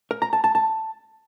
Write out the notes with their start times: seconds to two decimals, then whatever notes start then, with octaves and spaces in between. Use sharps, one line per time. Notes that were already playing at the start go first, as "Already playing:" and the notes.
0.11 A#4
0.22 A#5
0.33 A5
0.44 A5
0.55 A5